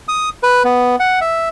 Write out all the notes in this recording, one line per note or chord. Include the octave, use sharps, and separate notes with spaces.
D#6
B4
B3
F#5
E5